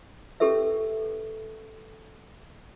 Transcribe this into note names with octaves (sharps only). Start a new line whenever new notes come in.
C#4 G4 A4 B4 E5